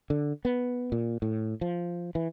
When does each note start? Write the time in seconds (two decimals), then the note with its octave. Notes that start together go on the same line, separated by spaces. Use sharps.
0.10 D3
0.45 B3
0.92 A#2
1.22 A2
1.61 F3
2.15 E3